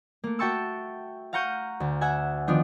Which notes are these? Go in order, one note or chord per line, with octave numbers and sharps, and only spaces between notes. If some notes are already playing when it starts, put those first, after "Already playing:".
A3 A#3
F#4 E5 G5 A5 C#6 E6
F5 F#5 A#5 C#6 G6 D#7
D2
E5 F#5 G#5
D#3 F3 B3 D4 D#4